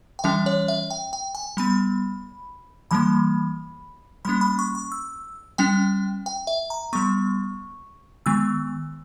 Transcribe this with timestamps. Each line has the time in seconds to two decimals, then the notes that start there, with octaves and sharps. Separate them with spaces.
0.19 G5
0.24 E3 G3 C#4 E5
0.46 C#5
0.68 E5
0.90 G5
1.13 G5
1.35 G#5
1.57 G3 B3 B5
2.91 E3 G3 A#3 B5
4.25 G3 A#3 C#4 B5
4.41 B5
4.59 C#6
4.75 C#6
4.92 E6
5.58 G3 C#4 G5
6.26 G5
6.47 E5
6.70 A#5
6.93 G3 B3 C#6
8.26 D#3 G#3 B3 E6